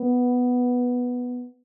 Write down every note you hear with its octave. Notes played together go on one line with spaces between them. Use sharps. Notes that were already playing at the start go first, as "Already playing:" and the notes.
Already playing: B3